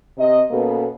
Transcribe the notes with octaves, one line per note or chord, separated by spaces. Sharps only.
C3 D#5
B2 A#3 B3 C#4 A4